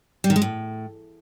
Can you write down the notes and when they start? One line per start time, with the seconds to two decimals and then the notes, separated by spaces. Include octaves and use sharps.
0.24 G3
0.30 D#3
0.36 G#3
0.42 A2